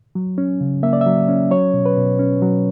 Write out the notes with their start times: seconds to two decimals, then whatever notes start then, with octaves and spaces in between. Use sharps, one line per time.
0.15 F#3
0.38 C#4
0.61 C#3
0.83 A#3 E5
0.93 D5
1.01 F#3 E5
1.29 C#4
1.51 F#3 C#5
1.74 B2
1.86 B4
1.97 B2
2.19 C#4
2.42 F#3